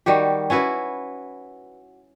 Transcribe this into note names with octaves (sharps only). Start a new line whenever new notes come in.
D#3 G3 F#4 G4
C#4 E4 F#4 B4